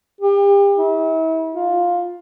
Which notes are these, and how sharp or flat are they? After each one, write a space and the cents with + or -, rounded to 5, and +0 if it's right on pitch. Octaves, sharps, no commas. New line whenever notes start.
G4 +35
E4 -40
F4 +10